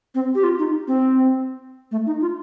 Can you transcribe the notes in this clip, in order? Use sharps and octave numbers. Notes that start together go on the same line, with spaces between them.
C4
G4
F4
D#4
C4
A3
D#4
F4